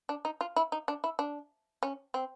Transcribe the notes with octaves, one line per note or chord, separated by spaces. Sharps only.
D4
D#4
F4
E4
D#4
D4
E4
D4
C#4
C4